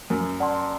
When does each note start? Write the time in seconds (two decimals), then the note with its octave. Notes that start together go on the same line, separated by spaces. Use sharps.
0.10 F#2 A#4
0.40 D5 F#5 A5 C6